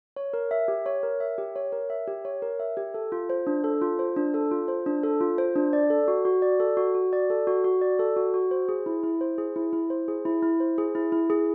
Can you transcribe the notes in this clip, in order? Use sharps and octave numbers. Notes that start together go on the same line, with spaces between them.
C#5
A#4
E5
G4
C#5
A#4
E5
G4
C#5
A#4
E5
G4
C#5
A#4
E5
G4
A4
F4
C5
D4
A4
F4
C5
D4
A4
F4
C5
D4
A4
F4
C5
D4
D5
A4
F#4
F#4
D5
A4
F#4
F#4
D5
A4
F#4
F#4
D5
A4
F#4
F#4
C5
G#4
E4
E4
C5
G#4
E4
E4
C5
G#4
E4
E4
C5
G#4
E4
E4
G#4